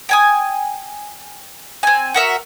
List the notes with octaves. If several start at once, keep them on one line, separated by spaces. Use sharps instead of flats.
G5 G#5 D#6
C4 G#5
F#4 A#4 E5